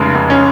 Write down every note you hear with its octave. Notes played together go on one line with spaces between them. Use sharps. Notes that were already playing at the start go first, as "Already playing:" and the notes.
Already playing: F1 C#3 G#3
F1
C#4